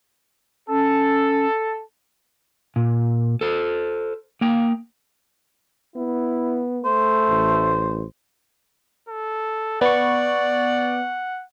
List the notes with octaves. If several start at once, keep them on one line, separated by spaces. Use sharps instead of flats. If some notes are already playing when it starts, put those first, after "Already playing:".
C#4 A4
A#2
A4 C5
A#3 G5
B3 E4
A3 C5
A1
A4
B3 D5 F#5 C#6